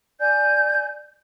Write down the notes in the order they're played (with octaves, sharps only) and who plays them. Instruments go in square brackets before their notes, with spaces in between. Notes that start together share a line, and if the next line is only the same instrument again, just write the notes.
[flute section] D5 G#5 G6